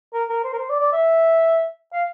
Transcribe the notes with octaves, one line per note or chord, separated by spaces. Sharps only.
A#4
A#4
C5
A#4
C5
D5
D5
E5
F5